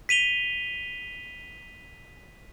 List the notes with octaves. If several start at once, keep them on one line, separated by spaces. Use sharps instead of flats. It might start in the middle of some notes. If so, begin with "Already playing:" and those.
B6 D#7 F7 G7